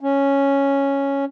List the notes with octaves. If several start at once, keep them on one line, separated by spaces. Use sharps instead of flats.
C#4